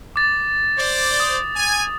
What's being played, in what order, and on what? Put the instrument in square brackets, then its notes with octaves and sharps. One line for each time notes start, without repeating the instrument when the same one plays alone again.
[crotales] D6 A6
[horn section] C5 D5
[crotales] D#6
[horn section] G#5